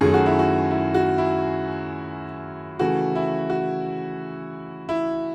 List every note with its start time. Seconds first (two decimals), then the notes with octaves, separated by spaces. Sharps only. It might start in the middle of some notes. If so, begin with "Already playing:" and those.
0.01 F#2 D#3 F#3 A3 G#4
0.14 F#4
0.26 E4
0.39 F#4
0.71 E4
0.94 F#4
1.18 E4
2.79 C#3 E3 A3 F#4
3.15 E4
3.50 F#4
4.89 E4